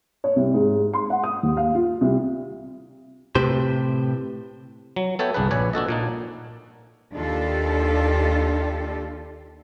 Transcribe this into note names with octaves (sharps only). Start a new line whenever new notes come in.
C#5
C2
G#2
C6
F#5
D#6
D#2
F5
F4
C2
A2 C3 G4 B4 C5
F#3
B3 A4 C#5 E5 G5
G1 C2 D4 G#4 B4
A#1 B4 C#5 D5 G#5
D4 F#4 A4 D#5
A#2 D4 D#4
D#2 D4 F4 G4 A4